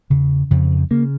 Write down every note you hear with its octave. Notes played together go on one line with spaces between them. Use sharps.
E2 C#3
F2 C#3
C#3 A#3